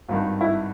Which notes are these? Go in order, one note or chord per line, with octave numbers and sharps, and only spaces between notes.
G#1 G2 D#3 F4
E4